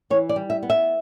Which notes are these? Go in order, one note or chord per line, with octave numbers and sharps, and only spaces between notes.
E3 C#5
D5
G3
E5
B3
E5